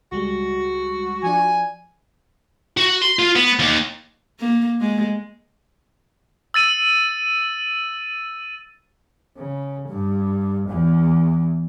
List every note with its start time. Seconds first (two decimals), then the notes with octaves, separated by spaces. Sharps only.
0.12 C#2 G3 G#3 F#4
1.23 F3 D4 G#5
2.77 F#4
3.02 C6
3.19 F4
3.36 B3
3.59 D#2
4.40 A#3
4.81 G#3
6.54 E6 A6 D#7 F#7
9.37 C#3
9.89 G2
10.69 E2